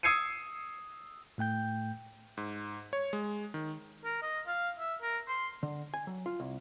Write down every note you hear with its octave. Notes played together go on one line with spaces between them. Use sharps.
D#6 E6 G#6 C7 C#7 D#7
A2 A3 G5 G6
G#2
C#5
G#3
D#3
A#4
D#5
F5
E5
A#4
C6
D3
G#5
F#3
F4
C2